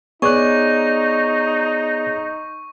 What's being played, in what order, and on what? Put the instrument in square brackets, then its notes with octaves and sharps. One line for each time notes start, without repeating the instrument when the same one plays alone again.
[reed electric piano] B3 D5 F#6 [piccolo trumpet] D#4 [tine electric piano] G#4 C#5 [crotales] C#6